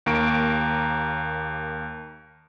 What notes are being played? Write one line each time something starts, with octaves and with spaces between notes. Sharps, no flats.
D#2 A#3 A#5 C#6 D7